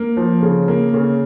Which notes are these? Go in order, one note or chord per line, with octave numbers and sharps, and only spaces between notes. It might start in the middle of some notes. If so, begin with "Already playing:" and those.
Already playing: A#3
F3
C#3
A#3
C#3